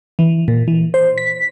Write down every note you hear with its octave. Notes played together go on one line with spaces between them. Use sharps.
E3
A#2
E3
C5
B6